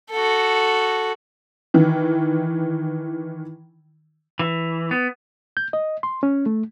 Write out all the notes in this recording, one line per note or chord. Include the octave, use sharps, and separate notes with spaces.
F#4 A4
D#3 E3
E3
B3
G6
D#5
C6
C#4
A3